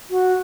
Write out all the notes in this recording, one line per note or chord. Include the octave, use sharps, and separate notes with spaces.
F#4